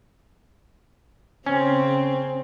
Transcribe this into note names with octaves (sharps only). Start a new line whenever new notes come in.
C#3 C4 C#4